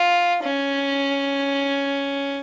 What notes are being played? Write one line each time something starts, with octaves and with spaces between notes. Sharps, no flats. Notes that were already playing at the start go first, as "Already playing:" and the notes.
Already playing: F4
C#4